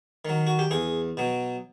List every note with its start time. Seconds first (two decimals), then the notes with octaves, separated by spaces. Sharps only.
0.25 D#3 F#3
0.47 F#4
0.59 G4
0.71 E2 G#4
1.17 B2 F#3